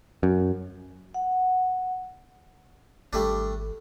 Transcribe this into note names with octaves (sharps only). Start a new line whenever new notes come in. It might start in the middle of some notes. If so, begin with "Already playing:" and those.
F#2
F#5
G#1 G3 A3 D4